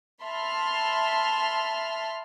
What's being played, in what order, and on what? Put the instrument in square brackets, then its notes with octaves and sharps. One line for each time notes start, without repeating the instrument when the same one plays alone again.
[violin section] E5 A5 B5 C6 F6